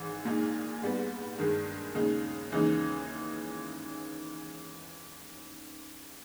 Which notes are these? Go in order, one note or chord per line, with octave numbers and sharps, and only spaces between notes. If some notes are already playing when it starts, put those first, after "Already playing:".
Already playing: G#1 G#2 E3
A#1 A#2 G#3 D#4 G#4
G#2 G3 B3
G2 D#3 G#3
D#2 C#3 G#3 D#4
D#2 C#3 E3 G#3 D#4